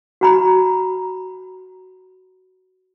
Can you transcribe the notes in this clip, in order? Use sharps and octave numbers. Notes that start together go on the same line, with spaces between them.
F#4 A#5 B5